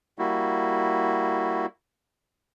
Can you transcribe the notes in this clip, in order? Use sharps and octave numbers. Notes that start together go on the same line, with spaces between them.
G3 A#3 E4 F#4